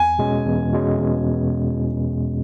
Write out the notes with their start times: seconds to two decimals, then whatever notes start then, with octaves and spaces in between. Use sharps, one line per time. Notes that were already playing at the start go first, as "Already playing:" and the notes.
Already playing: E2 G#5
0.19 B2 G#3 C#4
0.46 E2
0.73 B2 G#3 C#4
0.99 E2